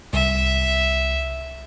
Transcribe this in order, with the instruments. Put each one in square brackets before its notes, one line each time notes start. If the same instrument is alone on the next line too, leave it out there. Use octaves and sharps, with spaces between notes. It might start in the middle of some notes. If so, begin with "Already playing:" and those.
[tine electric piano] C2 [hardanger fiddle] E5